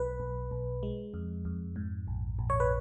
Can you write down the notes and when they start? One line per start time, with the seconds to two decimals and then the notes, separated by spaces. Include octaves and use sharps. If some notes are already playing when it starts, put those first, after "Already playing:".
Already playing: B1 B4
0.20 B1
0.51 B1
0.83 G#3
1.14 F2
1.45 F2
1.76 G#2
2.07 A#1
2.39 A#1
2.50 C#5
2.60 B4